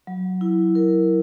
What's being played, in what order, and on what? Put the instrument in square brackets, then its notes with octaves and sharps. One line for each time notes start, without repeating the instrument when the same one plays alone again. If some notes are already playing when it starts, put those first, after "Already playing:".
[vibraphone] F#3
E4
A#4